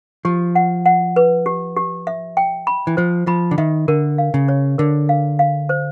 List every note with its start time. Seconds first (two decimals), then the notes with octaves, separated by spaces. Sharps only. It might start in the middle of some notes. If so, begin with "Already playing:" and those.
0.25 F3 G4
0.55 F#5
0.86 F#5
1.16 B4
1.46 G4
1.77 G4
2.07 E5
2.37 G5
2.67 B5
2.87 E3
2.97 F3 C5
3.27 F3 B5
3.51 D3
3.58 D#3 E5
3.88 D3 A#4
4.18 F5
4.34 C#3
4.48 C#5
4.78 D3 A#4
5.09 F5
5.39 F5
5.69 C5